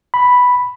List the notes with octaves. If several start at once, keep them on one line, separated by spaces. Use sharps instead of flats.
B5